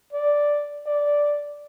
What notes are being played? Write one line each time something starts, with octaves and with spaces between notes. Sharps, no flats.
D5
D5